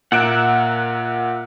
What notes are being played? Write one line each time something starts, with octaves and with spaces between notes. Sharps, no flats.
A#2 A#4 E5 F#5 F#6 D7